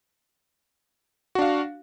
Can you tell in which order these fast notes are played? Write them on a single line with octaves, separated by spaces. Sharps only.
F#4 D4 F5